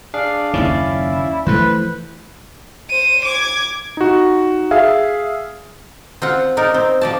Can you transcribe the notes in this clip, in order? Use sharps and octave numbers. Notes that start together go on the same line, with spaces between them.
D4 G#4 D5 F5
F#1 D#2 D#3 C#4 E4 D5 F5
E3 F3 A3 B4 C5
C5 D#7
D6 G#6
D#4 F#4
G#4 E5 F5
C4 F4 F#5
D#4 A#4 D5
C4
F3 D5 A5